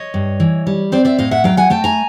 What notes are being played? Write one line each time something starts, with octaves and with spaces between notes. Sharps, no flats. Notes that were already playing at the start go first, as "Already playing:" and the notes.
Already playing: C#5 D#5
G2
E3
G3
C4 C5 D5
D5 E5
A2 D#5 F5
E5 F#5
F#3 F5 G5
F#5 G#5
A3 G5 A5
G#5 A#5